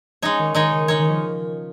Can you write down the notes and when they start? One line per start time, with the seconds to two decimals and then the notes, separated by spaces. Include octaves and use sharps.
0.22 G#3 C#4 D#4 C#5
0.39 D#3
0.55 D#3 G#3 D#4 C#5
0.71 C#3
0.88 D#3 G#3 D#4 C#5
0.99 D#3
1.09 F3